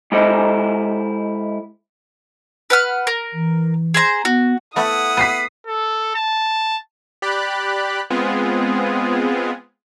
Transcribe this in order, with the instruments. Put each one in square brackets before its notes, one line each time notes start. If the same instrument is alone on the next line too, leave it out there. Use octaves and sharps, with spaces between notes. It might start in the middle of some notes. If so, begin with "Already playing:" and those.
[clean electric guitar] G#3 E4 G4 A4 C5 D#5
[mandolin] B4 F#5 F6
A#4
[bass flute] E3
[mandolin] G#4 C5 A#5
[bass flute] B3 [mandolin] F#4
[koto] A3 B3 [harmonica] E4 F#5 [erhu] D#6
[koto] B3 [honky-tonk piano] B6 C7 D#7
[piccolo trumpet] A4
A5
[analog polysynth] G4 D5 B5 F#6
G#3 B3 C4 F4 G#4